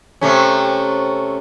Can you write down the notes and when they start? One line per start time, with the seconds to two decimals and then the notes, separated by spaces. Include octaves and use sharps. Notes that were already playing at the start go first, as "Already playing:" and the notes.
0.21 C3 A3 C#4